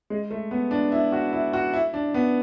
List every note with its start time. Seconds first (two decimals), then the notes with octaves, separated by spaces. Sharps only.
0.10 G#3
0.31 A3
0.51 B3
0.71 D4
0.92 E4
1.12 F#4
1.33 E4
1.53 F#4
1.73 E4
1.94 D4
2.14 B3